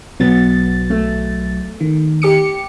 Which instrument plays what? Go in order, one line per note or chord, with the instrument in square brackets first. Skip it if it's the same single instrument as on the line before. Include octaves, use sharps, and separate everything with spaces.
[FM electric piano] B1 F#3 A6 [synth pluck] B3
[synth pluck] A3
[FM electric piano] D#3
[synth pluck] G4 D6 C#7